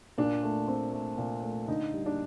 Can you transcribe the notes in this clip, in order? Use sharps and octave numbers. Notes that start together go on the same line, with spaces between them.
A#2 D4
A3
C4
A3
A#2
A3
D3 D#4
G3
D4